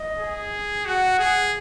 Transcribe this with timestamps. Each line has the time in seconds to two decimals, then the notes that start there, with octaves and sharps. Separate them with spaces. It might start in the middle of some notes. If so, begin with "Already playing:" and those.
Already playing: D#5
0.19 G#4
0.85 F#4 F#5
1.19 G#4